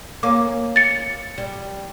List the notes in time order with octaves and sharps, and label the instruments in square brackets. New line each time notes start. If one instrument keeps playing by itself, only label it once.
[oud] A#3 C#4 [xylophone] D6
[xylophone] A6 C#7
[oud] G3